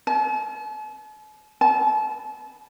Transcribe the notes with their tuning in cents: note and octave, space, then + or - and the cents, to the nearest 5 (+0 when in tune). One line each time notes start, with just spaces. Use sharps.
A5 -45
A5 -35